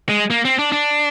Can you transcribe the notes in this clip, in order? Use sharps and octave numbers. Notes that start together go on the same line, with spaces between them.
G#3
A#3
C4
D4
D4